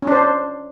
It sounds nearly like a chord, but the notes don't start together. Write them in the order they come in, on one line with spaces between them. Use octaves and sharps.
C#4 D4 C5